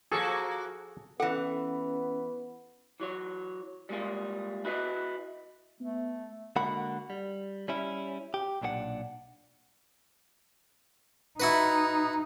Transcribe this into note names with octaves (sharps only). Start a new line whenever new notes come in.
F3 A#3 F#4 G#4 A4
E3 B3 C#4 A4 F#5
E3 F#3 C#5
G3 G#3 A#3 F4 G#4
E4 F#4 G#4 B4 C5 D#5
A3 B3
D3 G#3 A#3 F#4 F#5 B5
G3
G3 C#4 E4
G4
B1 A#2 D4 G4 F#5
D#4 E4 F#4 B4